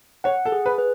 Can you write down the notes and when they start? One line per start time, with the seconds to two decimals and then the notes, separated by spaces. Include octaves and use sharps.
0.24 C#5 F#5
0.45 A4
0.52 G#4
0.66 B4
0.78 B4